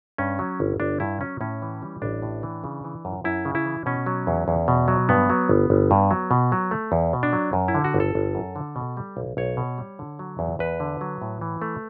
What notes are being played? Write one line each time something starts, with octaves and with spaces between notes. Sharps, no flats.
G2 C#4
F#3
G1
G1 D4
G2 E4
F#3 C#4
A2 C#4
E3
G3
A1 D4
A2
E3
C#3
E3
F#2
F#2 E4
C#3
E4
E3
B2 C#4
F#3
E2
E2
B2
F#3
G2 B3
F#3
G1
G1
G2
F#3
B2
F#3
A3
E2
B2
D4
F#3
F#2
E4
D3
F#4
G1
A4
G1
F#2
D3
B2
G3
B1
B1 C#5
B2
G3
D3
F#3
E2
E2 B4
D3
F#3
A2
E3
A3